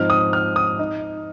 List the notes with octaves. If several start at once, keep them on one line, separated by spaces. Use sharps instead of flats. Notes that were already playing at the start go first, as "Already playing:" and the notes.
Already playing: G#2 F3 C4 D#4 F6
D#6
F6
D#6
D#4